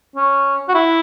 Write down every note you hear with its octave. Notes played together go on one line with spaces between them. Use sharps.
C#4
F#4
E4